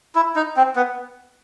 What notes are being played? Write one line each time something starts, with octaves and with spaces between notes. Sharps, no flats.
E4
D#4
C4
B3